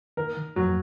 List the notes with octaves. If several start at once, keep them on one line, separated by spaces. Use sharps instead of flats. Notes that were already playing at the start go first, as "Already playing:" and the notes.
D#3 A#4
D#3
F2 F3 F#3